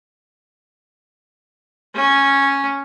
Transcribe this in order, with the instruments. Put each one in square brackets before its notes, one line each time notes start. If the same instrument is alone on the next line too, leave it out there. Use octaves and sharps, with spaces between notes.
[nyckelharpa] C#4